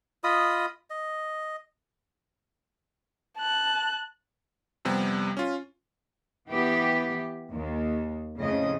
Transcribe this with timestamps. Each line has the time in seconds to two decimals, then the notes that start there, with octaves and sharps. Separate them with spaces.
0.24 F4 D#5 B5 D#6
0.90 D#5
3.38 A5 F#6
4.85 F2 C3 G3 B3
5.37 C#4 F4
6.49 E3 B3 G4
7.51 D#2
8.38 F2 A2 C#3 D#5